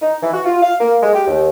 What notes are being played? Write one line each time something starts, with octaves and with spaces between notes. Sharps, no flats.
D#4
E3
F#4
F4
F5
A#3
G#3
G4
D#2